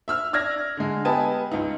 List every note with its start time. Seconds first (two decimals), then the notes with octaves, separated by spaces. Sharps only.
0.08 E5 E6 F6
0.33 D5 E6 F6 G#6 A#6
0.77 D3 G#3
1.05 B3 G4 B4 D#5 G#5 A5
1.52 C#2 D#4